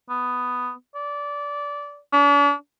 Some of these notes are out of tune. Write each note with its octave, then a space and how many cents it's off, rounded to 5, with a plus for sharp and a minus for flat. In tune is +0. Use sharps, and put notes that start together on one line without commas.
B3 +5
D5 -20
D4 -45